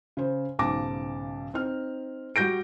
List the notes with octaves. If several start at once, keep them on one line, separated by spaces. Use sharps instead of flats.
C#3 C5
B1 G#2 C#3 A5 D6 A#6
C4 D#4 F6
G3 F#4 G6 A#6 D7